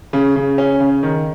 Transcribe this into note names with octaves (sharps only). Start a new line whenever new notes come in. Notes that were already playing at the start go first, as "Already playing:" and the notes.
C#3
C#3
C#4
C#3
D#3